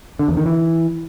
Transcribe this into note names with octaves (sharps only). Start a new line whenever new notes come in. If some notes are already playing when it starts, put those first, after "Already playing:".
D3
E2
D#3
E3